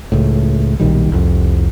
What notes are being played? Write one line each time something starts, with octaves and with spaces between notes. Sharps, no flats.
C#2 A2
B1 A#2 D#3 G3
C2 F2